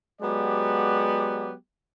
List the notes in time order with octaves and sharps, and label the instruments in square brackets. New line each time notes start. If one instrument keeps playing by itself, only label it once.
[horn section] F#3 G#3 B3 G4 D5